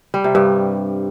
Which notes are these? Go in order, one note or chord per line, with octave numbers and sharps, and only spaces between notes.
G3
C3
G2